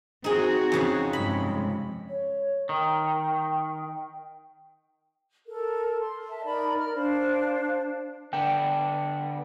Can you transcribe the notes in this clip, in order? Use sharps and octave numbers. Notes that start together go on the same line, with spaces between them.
C4 D#4 F#4 G#4
F2 C#3 G#5
G2 C3 G#3 B5
C#5
D#3 G5
A4 A#4
C6
E5 A5
D#4 A#4 D5 B5
A#4 F6
D4 C5 F5
D3 B3 D4 G5